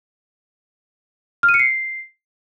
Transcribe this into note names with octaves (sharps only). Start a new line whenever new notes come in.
F6
D#7
C#7
C7